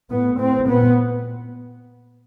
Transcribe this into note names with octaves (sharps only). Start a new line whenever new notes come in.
A2 B3
A2 C4
A#2 B3